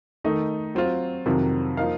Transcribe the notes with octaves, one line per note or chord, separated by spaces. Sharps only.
D#3 A3 D#4 A4 D#5
F#3 C4 F4
F2 C3 D#3 F#3
F3 A#3 D#4 A#4 F5